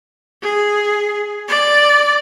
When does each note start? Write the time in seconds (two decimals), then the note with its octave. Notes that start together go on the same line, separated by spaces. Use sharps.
0.42 G#4
1.48 D5